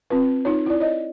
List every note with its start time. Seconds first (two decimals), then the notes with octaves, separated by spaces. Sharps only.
0.10 C4 F4 B4
0.45 D#4 F4 C#5
0.66 E4 D5
0.80 C#5 D#5